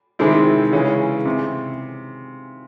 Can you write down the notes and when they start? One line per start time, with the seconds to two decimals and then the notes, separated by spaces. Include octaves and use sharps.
0.19 C3 D#3 G#3 C4 E4
0.72 C#3 E3 G#3 C#4
1.25 C3